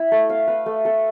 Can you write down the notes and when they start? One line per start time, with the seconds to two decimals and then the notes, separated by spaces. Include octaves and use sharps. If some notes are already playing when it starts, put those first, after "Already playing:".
Already playing: E4
0.12 A3
0.30 F5
0.47 B4
0.66 A3
0.85 A4